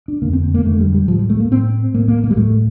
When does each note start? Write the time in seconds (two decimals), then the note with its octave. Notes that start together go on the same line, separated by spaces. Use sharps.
0.08 D4
0.22 F2 D3 A#3
0.33 C4
0.55 A#3
0.65 F2 D3 A3
0.80 G3
0.95 G3
1.08 A2 F3
1.19 G3
1.30 A3
1.40 A#3
1.51 A2 C4
1.95 A2 A#3
2.08 A#3
2.24 A#3
2.31 G3
2.37 A2 A3